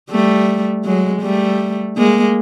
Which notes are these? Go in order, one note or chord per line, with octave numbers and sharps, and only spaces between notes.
G3 A3
F#3 G#3
G3 A3
G#3 A#3